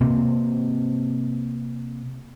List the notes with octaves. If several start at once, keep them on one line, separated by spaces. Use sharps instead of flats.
C3 A#3 C4